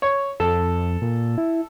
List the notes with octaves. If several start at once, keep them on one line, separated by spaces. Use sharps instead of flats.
C#5
F2 A4
A#2
E4